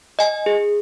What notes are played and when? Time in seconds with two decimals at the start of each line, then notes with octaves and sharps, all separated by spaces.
0.19 D#5 G#5
0.46 G#4